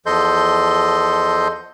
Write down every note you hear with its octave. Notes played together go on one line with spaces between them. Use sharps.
E2 F3 A4 D#5 C6 G6